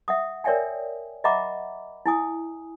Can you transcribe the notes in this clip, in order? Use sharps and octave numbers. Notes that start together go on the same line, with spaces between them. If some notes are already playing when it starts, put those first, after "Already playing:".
E5 F#5 D#6
A#4 C#5 D5 E5 G5 G#5
D#5 E5 F#5 A#5 B5 D6
E4 G#5 D#6